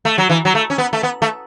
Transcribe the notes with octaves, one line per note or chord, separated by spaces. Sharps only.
A3
F#3
E3
F#3
A3
C#4
B3
A3
B3
A3